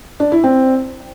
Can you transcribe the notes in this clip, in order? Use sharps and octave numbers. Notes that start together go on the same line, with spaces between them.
D4
E4
C4